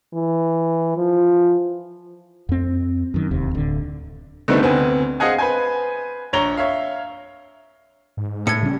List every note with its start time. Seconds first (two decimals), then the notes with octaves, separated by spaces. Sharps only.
0.13 E3
0.97 F3
2.49 F2 C4
3.14 F#2 D#3
3.31 E1 D#2 C3
3.55 D1 D3
4.48 D3 D#3 G3 A3 B3 C4
4.63 D2 B3 C4 G#5
5.20 G#4 C5 D#5 F5 F#5 G#5
5.38 B4 C5 G#5
6.33 A#1 C#5 A#5 F7 G7
6.57 C#5 E5 F5
8.17 G#2
8.47 A2 G#6 C#7
8.63 C#3 G3 C#4